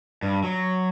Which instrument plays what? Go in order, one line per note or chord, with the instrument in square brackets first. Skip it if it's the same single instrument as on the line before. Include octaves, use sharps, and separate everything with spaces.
[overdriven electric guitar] G2
F#3